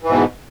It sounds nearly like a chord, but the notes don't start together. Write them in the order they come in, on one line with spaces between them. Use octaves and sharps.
E3 G#2 B2